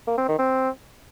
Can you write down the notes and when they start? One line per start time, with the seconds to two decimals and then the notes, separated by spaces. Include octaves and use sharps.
0.07 A#3
0.18 C4
0.28 D#3
0.38 C4